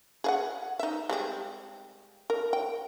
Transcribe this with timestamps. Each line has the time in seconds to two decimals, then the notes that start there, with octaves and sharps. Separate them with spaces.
0.24 G#4 F5 F#5
0.79 D#4 E5
1.09 G3 G#3 C4
2.30 A#4
2.53 G5